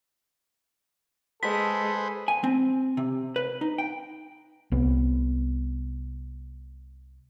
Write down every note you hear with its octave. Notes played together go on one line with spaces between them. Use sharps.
G#3 G#4 A4 B4 C5 B6
G#5
C4
C3
B4
D#4
G5
C2 B3